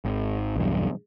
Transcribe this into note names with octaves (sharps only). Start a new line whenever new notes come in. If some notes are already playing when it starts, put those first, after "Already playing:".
G#1
B1 E2 G2